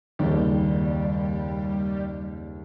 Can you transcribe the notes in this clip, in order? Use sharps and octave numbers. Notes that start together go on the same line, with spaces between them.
F#1 D#2 G3